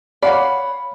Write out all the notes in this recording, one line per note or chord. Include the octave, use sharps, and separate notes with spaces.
C#5 D5 F5 F#5 B5